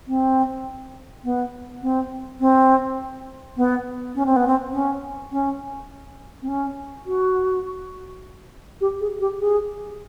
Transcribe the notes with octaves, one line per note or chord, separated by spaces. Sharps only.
C4
B3
C4
C4
B3
C#4
C4
B3
C4
C#4
C#4
C4
C#4
F#4
G4
G#4
G4
G#4